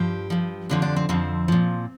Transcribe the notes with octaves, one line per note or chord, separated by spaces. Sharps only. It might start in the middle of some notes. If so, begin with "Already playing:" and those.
Already playing: G2 F3 G4
G2 F3
F2 D3 F3 F4
D4
C4
F2 D3 F3 C4
A#2 F3